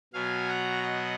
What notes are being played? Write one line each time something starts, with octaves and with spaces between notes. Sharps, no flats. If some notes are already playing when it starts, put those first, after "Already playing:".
B2 F#3 B3 F5 G#5
F#5 A#5
D#5 F#5